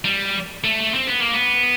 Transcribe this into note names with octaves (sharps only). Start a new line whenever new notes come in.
G3
A3
C4
B3
A#3
B3